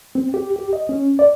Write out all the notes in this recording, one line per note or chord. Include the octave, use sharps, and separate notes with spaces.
C4
G4
G4
D#5
C#4
D5